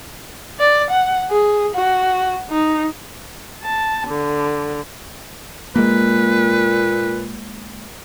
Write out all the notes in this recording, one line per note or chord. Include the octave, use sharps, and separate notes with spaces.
D5
F#5
G#4
F#4
D#4
A5
D3
A#2 G#3 A#3 B4